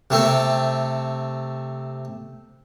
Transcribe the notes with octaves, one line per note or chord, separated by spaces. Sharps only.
C3 A3 C4